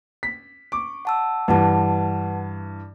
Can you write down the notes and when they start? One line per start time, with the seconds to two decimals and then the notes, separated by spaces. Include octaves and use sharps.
0.23 B6
0.72 C#6 D6
1.05 F#5 A5 E6
1.48 G2 E3 B4 F#5 A5